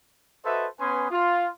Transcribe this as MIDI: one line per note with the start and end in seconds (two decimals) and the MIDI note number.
0.44 0.66 66
0.44 0.66 69
0.44 0.66 71
0.44 0.66 72
0.44 0.66 75
0.44 0.66 76
0.80 1.10 59
0.80 1.10 61
0.80 1.10 71
0.80 1.10 80
0.80 1.10 84
0.80 1.10 87
1.10 1.49 65